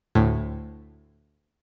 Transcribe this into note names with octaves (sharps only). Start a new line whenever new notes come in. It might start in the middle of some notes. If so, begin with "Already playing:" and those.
D2 A2